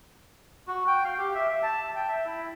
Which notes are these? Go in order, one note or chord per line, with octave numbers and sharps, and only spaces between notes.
F#4
G5
F5
G4
E5
E5
A5
G5
E5
E4